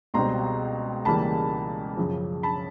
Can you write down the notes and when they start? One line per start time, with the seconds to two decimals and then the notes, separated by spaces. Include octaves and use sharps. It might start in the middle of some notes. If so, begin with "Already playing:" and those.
0.14 C#2 B2 G3 C4 A#5 C6
1.05 C#2 C#3 E3 G3 A#3 A5 B5
1.97 F#2 C#3 F3
2.43 A5 B5